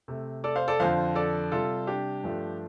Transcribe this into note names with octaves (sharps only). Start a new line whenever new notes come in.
C3 A3
A4 D5
C5 F5
A4 D5
F2 D3 F3 C5 F5
A4 D5
C3 G3 F4 A4
D4 G4
G2 F3 A3